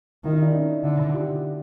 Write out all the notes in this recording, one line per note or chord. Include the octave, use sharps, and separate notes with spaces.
D#3 E4
D#4
D4 E4
C#4 D#4
D3 D4 E4
F4 G4